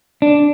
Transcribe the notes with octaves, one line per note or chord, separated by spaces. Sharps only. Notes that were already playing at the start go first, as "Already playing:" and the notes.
D4